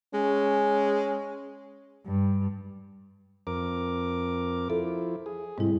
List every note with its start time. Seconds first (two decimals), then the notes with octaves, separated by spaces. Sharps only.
0.14 G#3 C#4
2.06 G2
3.47 F2 A#4 D6
4.70 F3 E4 A4
5.26 G#4
5.58 G#2 C3 G3 G#3 E4